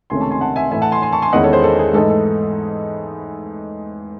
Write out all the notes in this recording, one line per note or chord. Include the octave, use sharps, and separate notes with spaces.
C#2 C3 D#3 A3 C#4 G#5 C6
A5 C#6
G#5 C6
F#5 A5
E5 G#5
A2 E3 A3 E5 G#5
F#5 A5
G#5 C6
G#5 C6
A5 C#6
G#5 C6
E2 D#3 G#3 C#4 E4 D#5 F#5
A4 C#5
G#4 C5
A4
G#4
G#2 E3 A3 D#4 A4
A4